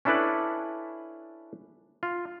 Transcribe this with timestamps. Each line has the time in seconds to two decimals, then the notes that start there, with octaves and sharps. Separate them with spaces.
0.05 C#4 D4 E4 A4 B4 D5
2.03 F4